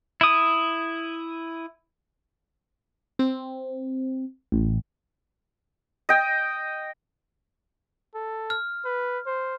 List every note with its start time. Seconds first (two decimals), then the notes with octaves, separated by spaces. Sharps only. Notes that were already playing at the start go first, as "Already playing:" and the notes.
0.21 E4 D#6
3.19 C4
4.52 A1
6.09 D#5 G5
8.15 A4
8.50 F6
8.85 B4
9.26 C5